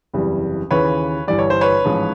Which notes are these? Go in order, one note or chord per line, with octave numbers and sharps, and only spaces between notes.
F#1 E2 C3 E3 G3
D#2 C#3 E3 B4 C#5
G1 G2 E3 G3 D5
C#5
C5
B4 C#5
A1 G#2 F3